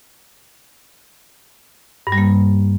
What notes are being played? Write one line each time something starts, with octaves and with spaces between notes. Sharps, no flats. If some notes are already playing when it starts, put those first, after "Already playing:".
G2
G3
A#3